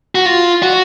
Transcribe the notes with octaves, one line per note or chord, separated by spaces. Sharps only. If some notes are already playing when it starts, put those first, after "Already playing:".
F#4
F4
F#4